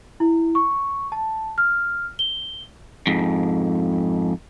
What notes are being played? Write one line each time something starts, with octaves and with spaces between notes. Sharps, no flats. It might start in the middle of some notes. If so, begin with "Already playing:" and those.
E4
C#6
A5
F6
G7
F2 G#2